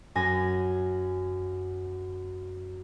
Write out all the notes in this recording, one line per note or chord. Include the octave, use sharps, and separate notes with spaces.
F#2 G#5 A#6